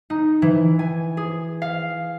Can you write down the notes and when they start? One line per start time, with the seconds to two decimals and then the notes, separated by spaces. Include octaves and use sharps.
0.10 D#4
0.42 E3
0.79 G#5
1.17 G#4
1.62 F5